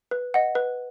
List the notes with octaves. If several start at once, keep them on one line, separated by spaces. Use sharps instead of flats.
B4
D#5 F#5
B4